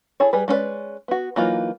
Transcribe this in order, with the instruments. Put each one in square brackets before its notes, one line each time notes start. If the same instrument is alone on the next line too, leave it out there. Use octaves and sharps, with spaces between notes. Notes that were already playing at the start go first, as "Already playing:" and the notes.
[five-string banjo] E4 G#4 A4 C#5
G3 G#4 B4
G#3 C#4 D#4 B4 D5
B3 F#4
E3 F#3 A#3 D#4 F4